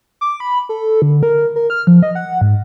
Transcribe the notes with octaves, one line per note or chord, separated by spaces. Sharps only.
D6
B5
A4
D3
A#4
A#4
F6
F3
D#5
F#5
G#2